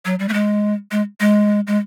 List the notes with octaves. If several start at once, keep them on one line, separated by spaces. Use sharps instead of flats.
F#3
G3
A3
G#3
G#3
G#3
G#3